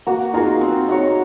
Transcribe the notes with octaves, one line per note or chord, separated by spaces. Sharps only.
A#3 F#4
D#4 F4 F#4 G#4 A#4
C4
D#4 F#4 C#5